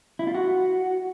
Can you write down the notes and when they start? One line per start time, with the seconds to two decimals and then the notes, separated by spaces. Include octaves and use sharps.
0.19 E4
0.27 F4
0.35 F#4